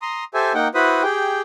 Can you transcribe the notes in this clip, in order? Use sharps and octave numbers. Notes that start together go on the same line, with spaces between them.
A#5 C6 D#6
G4 A4 C5 E5 G#5
A#3 D#4 F#5 G5
E4 F#4 B4 C5 B5 D#6
G4 G#4 G5